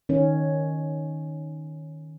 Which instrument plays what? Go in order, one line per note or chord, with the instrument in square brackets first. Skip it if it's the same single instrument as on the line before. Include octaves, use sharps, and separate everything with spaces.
[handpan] D#3 C#4